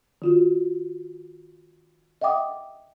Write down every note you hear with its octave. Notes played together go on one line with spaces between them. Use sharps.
D#3 F4 F#4
D#5 E5 F#5 G5 D6 D#6